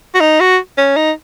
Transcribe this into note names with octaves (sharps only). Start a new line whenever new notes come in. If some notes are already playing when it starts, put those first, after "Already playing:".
F#4
D#4
F#4
C#4
D#4